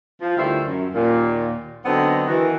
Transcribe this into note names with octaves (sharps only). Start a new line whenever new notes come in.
F3
D2 D#3 G3 E4 F4 C5
F#2
D#2 A#2
D3 F#3 B3 C4 D#4
D#3 E3 F#4